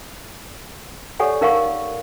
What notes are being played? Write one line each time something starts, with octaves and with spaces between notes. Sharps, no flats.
G4 A4 C#5 D5 F#5 G#5
D#4 A#4 F5 F#5 C#6